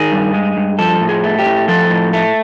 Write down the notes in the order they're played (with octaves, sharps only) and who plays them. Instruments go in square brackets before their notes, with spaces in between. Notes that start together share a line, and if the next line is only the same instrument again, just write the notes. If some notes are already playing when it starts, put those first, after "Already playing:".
Already playing: [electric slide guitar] D#3 G#4
G2
G#3
G2
F3 A4
A2
G#4
A3
G4
A2
F3 A4
A2
A3